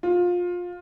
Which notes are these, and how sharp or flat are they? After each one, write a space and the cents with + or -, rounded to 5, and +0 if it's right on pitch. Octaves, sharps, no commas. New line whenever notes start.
F4 +20